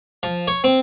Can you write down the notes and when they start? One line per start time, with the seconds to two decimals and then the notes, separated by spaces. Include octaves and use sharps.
0.23 F3
0.48 C#5
0.64 C4